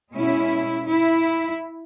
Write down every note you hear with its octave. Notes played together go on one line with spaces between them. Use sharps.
B2 G#3 C#4 E4
E4